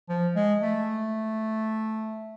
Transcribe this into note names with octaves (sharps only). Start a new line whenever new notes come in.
F3
G#3
A3